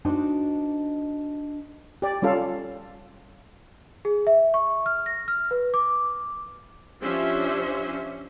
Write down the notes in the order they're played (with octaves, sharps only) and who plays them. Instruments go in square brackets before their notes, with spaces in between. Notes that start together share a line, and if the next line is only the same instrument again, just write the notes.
[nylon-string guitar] D4 D#4 F#4 C5
[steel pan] G4 D5
G3 C#4 F4 A4 F5
[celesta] G#4
E5
C#6
F6
A#6
F6
B4
D6
[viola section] F3 C#4 D4 G4 C5 E5